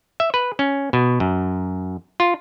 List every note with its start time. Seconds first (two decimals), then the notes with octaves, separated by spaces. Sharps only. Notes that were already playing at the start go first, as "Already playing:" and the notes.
0.20 E5
0.34 B4
0.59 C#4
0.93 B2
1.20 F#2
2.20 F4